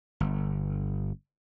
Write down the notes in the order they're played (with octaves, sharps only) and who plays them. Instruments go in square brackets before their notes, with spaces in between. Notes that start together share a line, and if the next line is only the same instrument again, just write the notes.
[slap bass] G1